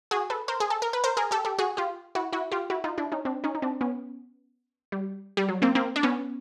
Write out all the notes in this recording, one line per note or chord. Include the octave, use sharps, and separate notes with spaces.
F#4 G#4
A4 B4
A#4 C5
G#4
A4
A#4
B4
A#4 C5
G#4 A#4
G4 A4
G4 A4
F#4 G#4
F4 G4
E4 F#4
E4 F#4
F4 G4
E4 F#4
D#4 F4
D4 E4
C#4 D#4
C4 D4
C#4 D#4
D#4
C4 D4
B3 C#4
G3
G3
F#3
A#3 C4
A#3 C4
D4
B3 C#4